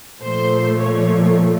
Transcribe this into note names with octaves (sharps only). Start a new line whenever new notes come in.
A#2 F3 A3 C5
C#5